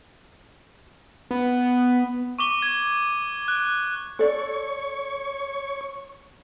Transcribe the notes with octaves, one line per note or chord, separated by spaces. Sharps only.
B3
C#6 D6 G7
G#6
F#6
A4 C#5 D5 C#6